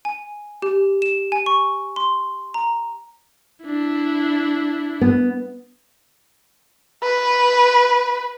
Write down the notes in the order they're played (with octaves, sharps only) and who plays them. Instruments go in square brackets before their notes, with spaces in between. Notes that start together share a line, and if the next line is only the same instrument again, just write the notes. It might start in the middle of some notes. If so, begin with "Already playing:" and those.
[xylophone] G#5
G4
E7
G#5
C#6
C6
A#5
[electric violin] D4 E4
[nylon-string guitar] B3
[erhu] B4